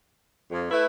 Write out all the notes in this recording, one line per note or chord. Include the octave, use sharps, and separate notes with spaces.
F2
A3 E4 B4